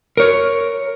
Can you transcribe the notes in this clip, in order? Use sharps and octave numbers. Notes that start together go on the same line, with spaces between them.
A#4 C#5